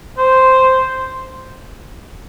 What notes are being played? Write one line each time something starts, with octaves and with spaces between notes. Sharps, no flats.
C5